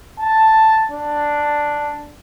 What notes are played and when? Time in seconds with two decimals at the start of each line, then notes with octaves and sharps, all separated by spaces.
0.20 A5
0.91 D4